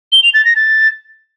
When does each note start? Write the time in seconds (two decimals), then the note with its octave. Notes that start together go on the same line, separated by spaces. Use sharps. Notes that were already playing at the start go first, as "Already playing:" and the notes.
0.12 G7
0.23 F7
0.34 A6
0.45 A#6
0.56 A6